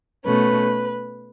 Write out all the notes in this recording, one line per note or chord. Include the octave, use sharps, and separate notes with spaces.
B2 A3 C#4 B4